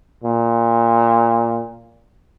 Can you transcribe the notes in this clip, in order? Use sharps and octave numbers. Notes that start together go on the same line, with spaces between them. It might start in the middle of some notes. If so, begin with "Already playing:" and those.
A#2